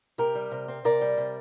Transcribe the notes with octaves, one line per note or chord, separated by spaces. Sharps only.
C3 G4 A#4
G3
C3
C4
C3 A#4 D5
G3
C3